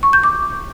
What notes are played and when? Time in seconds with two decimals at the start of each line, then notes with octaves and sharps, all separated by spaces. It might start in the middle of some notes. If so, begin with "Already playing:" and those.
0.03 C#6
0.13 G6
0.23 D6